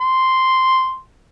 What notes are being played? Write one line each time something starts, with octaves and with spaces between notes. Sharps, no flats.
C6